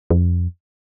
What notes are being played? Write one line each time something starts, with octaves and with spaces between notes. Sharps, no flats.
F2